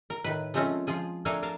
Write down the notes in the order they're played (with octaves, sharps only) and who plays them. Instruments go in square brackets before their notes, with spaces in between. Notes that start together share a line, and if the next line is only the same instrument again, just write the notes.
[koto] A#4
A2 D#3 B4
F3 G#3 A3 C4 C#4 F4
F3 F4 G#4
A3 D4 A4 A#4 F5 G#5
A#4 F5 A5